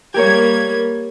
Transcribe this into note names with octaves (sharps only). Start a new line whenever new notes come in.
G3 A#3 G4 A#4 C#5 G#6